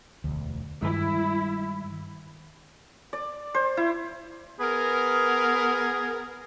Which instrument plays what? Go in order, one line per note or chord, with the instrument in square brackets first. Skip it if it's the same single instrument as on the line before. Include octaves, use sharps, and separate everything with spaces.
[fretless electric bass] E1 D2
[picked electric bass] G2 [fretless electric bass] D#3 G3 G#3 [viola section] E4
[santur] D5
C5
E4
[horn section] B3 A#4 [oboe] G#4